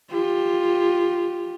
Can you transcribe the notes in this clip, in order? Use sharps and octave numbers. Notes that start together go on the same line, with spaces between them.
F4 G4